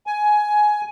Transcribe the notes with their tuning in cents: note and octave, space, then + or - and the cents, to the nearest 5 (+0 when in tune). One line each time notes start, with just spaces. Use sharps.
G#5 +15